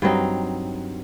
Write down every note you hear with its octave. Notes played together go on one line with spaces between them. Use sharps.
G2 F#3 C4 D#4